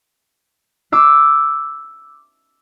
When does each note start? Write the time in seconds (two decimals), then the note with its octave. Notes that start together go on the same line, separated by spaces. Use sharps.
0.92 D6 E6 C7